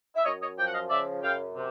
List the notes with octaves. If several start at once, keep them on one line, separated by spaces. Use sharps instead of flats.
E5
F#2 C#5 D#5
C#5 D#5
F3 G5
F#5
D#5 F5
C#3 D5 E5
F#2 F5 G5
C3